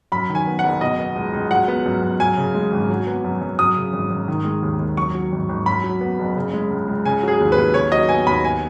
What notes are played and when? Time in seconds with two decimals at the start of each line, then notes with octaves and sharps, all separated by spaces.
0.12 F#2 B5
0.29 D#3
0.35 G#5
0.47 B3
0.59 F#5
0.64 F#1
0.81 B2 D#5
0.99 B3
1.16 C#2
1.33 C#2
1.51 F#3 F#5
1.68 B3
1.86 F#2
2.03 F#2
2.20 F#2 G#5
2.38 C#3
2.54 G#3
2.72 G#1
2.90 F#3
3.07 B3
3.24 F#2
3.42 F#2
3.59 F#2 D#6
3.76 C#3
3.93 G#1
4.10 G#1
4.28 D#3
4.45 G#3
4.62 D#2
4.79 D#2
4.97 F#2 C#6
5.15 F#3
5.33 G#1
5.49 G#1
5.66 F#2 B5
5.84 F#3
6.01 B3
6.19 F#1
6.36 C#3
6.53 G#3
6.70 C#2
6.87 C#2
7.05 C#3 G#5
7.23 F#3 G#4
7.40 D#2
7.52 B4
7.58 D#2
7.74 C#3 C#5
7.91 F#3 D#5
8.09 B3 G#5
8.26 D#2 B5
8.44 G#5